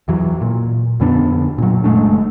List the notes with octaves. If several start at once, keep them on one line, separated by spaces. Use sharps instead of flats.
E2 E3 F#3
A#2
F2 D3 B3 D4
A#2 F#3
F#1 G#3 A3 D4